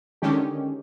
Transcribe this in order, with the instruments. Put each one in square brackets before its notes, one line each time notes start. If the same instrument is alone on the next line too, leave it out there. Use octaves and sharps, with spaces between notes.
[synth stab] D3 D#3 G#3 C#4 G4